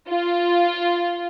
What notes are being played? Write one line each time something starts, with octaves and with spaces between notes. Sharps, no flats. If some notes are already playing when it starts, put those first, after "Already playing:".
F4